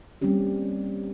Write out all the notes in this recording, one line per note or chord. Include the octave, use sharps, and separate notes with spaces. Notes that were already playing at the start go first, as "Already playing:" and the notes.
G3 A#3 C4 C#4 G4